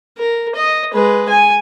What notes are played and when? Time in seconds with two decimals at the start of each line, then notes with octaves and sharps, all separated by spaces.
0.18 A#4
0.55 D#5
0.93 G#3 B4
1.29 G#5